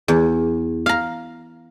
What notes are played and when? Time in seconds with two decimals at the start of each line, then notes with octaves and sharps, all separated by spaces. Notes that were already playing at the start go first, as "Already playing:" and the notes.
0.08 E2
0.86 F5 A#5